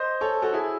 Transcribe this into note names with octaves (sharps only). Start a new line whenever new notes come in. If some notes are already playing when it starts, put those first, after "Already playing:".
Already playing: C5 D#5
A4 C#5
F#4 A4
E4 G#4